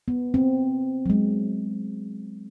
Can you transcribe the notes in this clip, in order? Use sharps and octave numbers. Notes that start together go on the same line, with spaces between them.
B3
C4
F#3 G#3